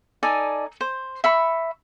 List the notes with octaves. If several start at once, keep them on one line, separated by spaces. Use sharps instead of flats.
D#4 A4 D5 G#5
C5
E5 B5 C#6